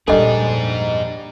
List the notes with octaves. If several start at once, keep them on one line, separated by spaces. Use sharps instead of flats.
F2 A#2 G3 D4 D#4 G#4 A4 D#5